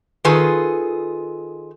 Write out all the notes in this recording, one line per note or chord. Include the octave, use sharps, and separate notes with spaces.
D#3 F4 G#4 A4 B4